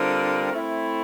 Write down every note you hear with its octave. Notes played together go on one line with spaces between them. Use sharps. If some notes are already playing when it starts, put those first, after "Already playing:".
Already playing: D3 G3 C4 F4 A#4
A3 C4 E4